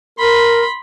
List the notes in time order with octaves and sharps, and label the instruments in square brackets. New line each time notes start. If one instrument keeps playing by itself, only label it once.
[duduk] A#4 [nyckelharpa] B5 C6